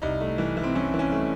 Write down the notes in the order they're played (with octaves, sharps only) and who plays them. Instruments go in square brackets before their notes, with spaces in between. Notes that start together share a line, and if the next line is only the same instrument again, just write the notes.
[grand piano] C2 D#4
A3
E3
E3
C4
E3 C#4
E3
C#4
A3